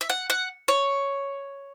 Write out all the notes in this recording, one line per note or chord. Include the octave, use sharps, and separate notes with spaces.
E5
F#5
F#5
C#5